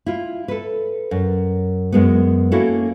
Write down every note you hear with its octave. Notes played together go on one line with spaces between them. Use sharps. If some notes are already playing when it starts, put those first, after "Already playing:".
E4 F4
A4 B4
F#2
F#2 G#3 B3
A#3 C#4 E4 F#4 A4